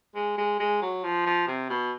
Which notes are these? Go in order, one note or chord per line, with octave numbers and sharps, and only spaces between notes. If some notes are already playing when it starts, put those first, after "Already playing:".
G#3
G#3
G#3
F#3
F3
F3
C3
B2